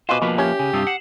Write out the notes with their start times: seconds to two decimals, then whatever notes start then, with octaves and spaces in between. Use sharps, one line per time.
0.09 B2 F4 B4 C5 D#5 G#5 D6
0.22 B2 F3 A#3 B4
0.38 C#4 G4 E5
0.59 C#3 G#5
0.73 G2 C3 F4 A5 D#6 E6
0.87 F#5 C7 E7 F#7